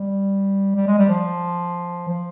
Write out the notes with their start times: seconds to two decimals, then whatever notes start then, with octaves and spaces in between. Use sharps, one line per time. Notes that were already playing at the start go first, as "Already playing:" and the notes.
Already playing: G3
0.76 G3
0.87 G#3
0.99 G3
1.09 F3
2.08 F3